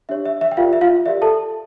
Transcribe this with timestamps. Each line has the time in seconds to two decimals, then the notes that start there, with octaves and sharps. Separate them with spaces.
0.09 D4 G4 C#5 E5
0.26 E5
0.41 E5
0.52 G5
0.57 F4 G4 A#4 D5 F5
0.73 E5
0.81 F4 F5
1.06 G4 A#4 D5 E5
1.22 A4 A5